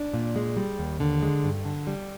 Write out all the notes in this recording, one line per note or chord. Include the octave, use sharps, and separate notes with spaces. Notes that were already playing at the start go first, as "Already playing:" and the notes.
Already playing: D4
A#2
G#3
G3
D#2
D3
G#3
G2
D3
G3